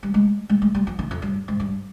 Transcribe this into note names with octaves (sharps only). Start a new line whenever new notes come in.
G3
G#3
G#3
G#3
G3
F3
D#3
F2
G2
G#2
G2